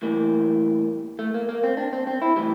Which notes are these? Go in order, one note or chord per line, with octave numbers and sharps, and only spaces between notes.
A2 E3 G3 A#3
A3
A#3
A#3
C4
D4
C4
C4
E4
A2 E3 G3